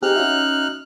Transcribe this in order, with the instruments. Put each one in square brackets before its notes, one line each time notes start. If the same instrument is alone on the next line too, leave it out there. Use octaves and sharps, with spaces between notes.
[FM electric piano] C4 G4 G#4 [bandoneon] D#4 F6 F#6
[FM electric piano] C#4 F#4 E5